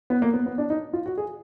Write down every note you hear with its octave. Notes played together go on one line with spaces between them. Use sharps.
B3
A#3
B3
B3
D4
D#4
F4
F#4
G#4